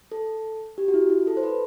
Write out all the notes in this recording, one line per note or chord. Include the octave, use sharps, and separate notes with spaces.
A4
G4
F#4
E4
E4
A4
C5
B4